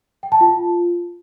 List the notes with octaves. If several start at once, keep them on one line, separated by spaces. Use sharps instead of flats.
G5
A5
F4